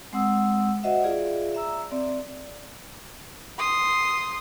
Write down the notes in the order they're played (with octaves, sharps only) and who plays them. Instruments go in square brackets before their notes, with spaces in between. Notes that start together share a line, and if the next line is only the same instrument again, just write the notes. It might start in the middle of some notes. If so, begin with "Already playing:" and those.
[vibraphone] G#3 C4 F#5 D#6 E6
F#4 C5 D#5 E5 F#5
F4 G#4 D5 E5 F5
E5 A#5 E6
C4 D5 E5
[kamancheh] C6 D#6